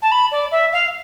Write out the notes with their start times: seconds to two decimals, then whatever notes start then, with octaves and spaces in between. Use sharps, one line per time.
0.02 A5
0.11 B5
0.31 D5
0.51 E5
0.72 F5